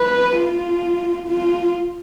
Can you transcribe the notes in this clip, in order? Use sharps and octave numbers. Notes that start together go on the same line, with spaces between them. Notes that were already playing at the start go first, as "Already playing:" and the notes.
Already playing: B4
F4
F4